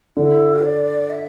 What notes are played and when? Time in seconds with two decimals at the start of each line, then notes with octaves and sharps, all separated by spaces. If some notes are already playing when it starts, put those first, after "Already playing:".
0.17 D3 E4
0.64 D5
1.10 E5